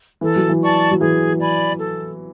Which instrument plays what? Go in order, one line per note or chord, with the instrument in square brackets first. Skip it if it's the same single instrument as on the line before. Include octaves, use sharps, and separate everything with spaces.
[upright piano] E3 [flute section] A4
[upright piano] F#3
E3
[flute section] D5 A5 C#6
[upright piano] F#3
[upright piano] E3 [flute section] G#4
[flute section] D5 G#5 B5
A4